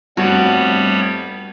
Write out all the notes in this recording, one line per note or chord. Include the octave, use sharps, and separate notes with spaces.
F1 G2 G3 B3 F#4 C#5